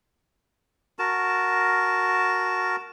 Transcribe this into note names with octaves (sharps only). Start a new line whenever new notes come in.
F#4 A#4 A5